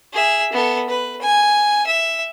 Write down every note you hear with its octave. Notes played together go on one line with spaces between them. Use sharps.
G#4 E5
B3 A4
B4
G#5
E5